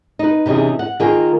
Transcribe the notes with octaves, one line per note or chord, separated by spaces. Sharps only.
D#4 B4
C3 E3 C#4 D#4 G#4
F#5
D#3 A#3 F4 G#4